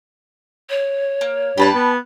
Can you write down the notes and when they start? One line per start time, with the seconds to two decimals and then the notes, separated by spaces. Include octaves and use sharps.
0.69 C#5
1.21 A#3
1.58 G2 G4 B4 A5
1.75 B3